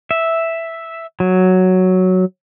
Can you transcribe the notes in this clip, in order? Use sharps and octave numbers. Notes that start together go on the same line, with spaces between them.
E5
F#3